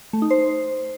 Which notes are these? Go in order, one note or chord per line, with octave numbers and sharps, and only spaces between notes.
A3
D#4
C5